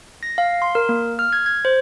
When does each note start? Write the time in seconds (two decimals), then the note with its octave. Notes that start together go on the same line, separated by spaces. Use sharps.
0.23 A#6
0.38 F5
0.62 C6
0.75 A#4
0.89 A#3
1.19 F6
1.33 G#6
1.46 G#6
1.65 C5